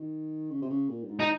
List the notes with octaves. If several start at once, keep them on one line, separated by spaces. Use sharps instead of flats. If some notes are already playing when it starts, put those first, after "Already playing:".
Already playing: D#3
C#3
C3
C#3
A#2
G2
G#2
D#4